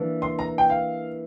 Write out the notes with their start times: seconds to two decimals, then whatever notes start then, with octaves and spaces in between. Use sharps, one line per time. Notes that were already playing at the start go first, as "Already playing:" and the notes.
Already playing: E3 A#3 D4
0.22 C6
0.39 A#5
0.58 G5
0.70 F5